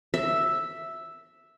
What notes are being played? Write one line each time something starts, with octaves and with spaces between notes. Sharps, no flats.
E5